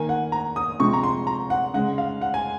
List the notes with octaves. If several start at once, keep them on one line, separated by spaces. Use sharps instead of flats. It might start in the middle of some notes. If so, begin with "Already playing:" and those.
Already playing: D#3 A#3 G#5
F#5
A#5
D#6
C3 F3 G#3 C#6
A#5
C6
A#5
F#5
C#3 G#3 F#5
F5
F#5
G#5